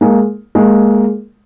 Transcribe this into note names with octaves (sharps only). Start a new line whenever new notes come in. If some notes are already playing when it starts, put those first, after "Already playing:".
G#3 A#3
G#3 A#3